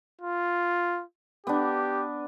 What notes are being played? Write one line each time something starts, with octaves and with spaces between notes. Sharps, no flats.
F4
B3 D4 G4